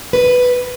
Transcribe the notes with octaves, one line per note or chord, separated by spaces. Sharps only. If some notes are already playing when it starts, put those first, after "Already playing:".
B4